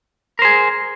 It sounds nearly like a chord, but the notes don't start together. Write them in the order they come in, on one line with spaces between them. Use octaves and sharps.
A#4 C5 G#4